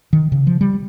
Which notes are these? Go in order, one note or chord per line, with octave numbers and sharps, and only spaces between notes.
D#3
C#3
F3
G3